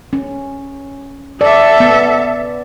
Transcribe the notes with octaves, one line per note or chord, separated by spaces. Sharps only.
C#4
A4 D5 E5
B3